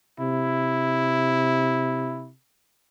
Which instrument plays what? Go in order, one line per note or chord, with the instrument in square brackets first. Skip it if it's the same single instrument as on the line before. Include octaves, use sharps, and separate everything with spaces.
[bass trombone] C3 [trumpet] E4